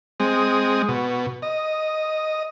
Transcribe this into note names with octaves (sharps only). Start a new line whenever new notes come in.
G#3 C4 D#6
B2
D#5